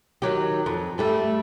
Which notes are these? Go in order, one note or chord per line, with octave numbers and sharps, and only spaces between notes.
D#3 F#3 G4
F2
G2 G3 A3